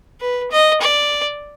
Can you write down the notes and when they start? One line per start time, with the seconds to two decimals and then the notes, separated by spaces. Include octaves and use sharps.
0.21 B4
0.51 D#5
0.81 D5